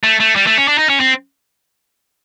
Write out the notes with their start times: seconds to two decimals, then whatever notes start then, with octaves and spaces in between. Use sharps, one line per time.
0.03 A3
0.20 A3
0.36 G3
0.47 A3
0.58 C#4
0.68 D4
0.78 D#4
0.90 C#4
1.00 C4